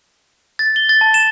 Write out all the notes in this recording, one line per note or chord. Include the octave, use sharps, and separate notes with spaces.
A6
G7
A6
A5
E7